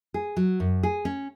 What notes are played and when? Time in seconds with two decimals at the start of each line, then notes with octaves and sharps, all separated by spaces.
0.14 G#4
0.37 F#3
0.60 F#2
0.83 G#4
1.05 C#4